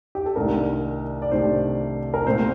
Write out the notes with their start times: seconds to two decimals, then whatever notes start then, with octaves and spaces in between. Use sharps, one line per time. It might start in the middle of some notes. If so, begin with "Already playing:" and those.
0.15 G4
0.26 A4
0.36 C2 C3 D#3 A3 D4 A#4
1.22 D5
1.31 C2 C3 D#3 A3 D4 C5
2.14 A#4
2.26 C2 A#2 A3 C4 F4 C5